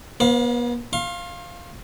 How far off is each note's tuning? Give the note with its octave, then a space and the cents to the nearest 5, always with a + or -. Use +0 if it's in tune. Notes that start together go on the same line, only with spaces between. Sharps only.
B3 -40 C5 +0 F5 +30
F5 +0 C6 +40